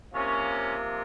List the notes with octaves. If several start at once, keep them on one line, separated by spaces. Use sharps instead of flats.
C3 F3 A#3 C#4